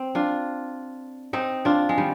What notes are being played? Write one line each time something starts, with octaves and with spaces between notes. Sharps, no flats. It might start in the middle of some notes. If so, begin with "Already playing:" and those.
Already playing: C4
D4 F4
C4 D#4
D4 F4
G#3
D#3 G3